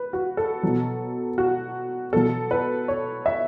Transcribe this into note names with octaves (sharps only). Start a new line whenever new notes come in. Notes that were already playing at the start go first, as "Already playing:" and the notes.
Already playing: B4
F#4
A4
B2 F#3
F#4
B2 F#3 A4
B4
C#5
E5